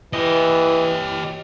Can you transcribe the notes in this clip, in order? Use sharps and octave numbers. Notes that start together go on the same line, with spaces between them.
E3 G4 D#5